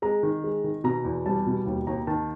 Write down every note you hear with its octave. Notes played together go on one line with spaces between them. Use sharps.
G#3 A#5
D#3
G#3
D#3
B2 A#5
E2
G3 A5
B2
D#2
D#2 A#5
D#3 A5